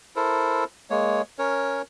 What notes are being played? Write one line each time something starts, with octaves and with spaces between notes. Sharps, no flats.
E4 A4 A#4 C5
G#3 A#3 C#5
C#4 A#4 C#5